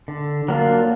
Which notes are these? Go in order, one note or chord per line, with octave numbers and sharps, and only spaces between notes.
D3
F#3 A#3 D4 F4